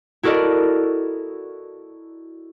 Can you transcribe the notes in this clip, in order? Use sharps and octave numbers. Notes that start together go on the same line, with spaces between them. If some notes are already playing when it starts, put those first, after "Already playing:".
E4 F#4 A4 A#4 D5 D#5